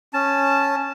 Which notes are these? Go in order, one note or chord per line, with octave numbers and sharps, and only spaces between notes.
C#4 A5